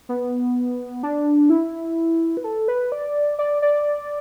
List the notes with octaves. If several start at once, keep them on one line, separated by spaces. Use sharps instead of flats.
B3
D4
E4
B4
A4
B4
D5
D5
D5